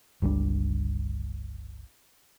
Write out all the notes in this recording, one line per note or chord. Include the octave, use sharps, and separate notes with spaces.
G1 C#2 G3 D4